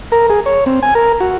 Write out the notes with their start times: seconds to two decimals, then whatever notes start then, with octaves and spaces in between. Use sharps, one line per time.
0.12 A#4
0.30 G#4
0.46 C#5
0.66 C4
0.83 G#5
0.95 A#4
1.20 F#4